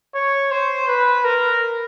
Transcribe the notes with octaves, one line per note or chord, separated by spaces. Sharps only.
C#5
C5
B4
A#4